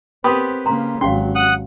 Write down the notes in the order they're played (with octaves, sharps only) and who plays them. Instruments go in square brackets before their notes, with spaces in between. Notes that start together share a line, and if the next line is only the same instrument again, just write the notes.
[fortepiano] B3 G4 B4 [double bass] C4 [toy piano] A#4 C6 D#6
[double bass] C#3 A#3 [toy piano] A#5 C6
[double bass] G#1 F#3 [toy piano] C#4 G4 F5 [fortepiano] C6
[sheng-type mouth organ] F#5 D#6 F#6